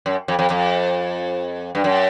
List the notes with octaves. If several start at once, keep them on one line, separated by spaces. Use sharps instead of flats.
F#2
F2
F2
F2
G2
F#2